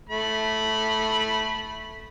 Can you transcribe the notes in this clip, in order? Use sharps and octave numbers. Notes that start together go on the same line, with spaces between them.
A3 B5